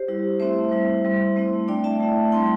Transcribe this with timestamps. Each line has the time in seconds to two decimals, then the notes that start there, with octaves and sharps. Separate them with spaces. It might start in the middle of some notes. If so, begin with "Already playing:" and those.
Already playing: G4 C5
0.08 G3 E4
0.40 A3 C4 E4 C5 E5
0.72 G3 E4
1.04 G3 C4 E4
1.36 A3 C4 E4
1.68 A3 D4 D5 G5
1.84 E5 A5
2.00 A3 E4
2.32 G3 C4 E4 G5 C6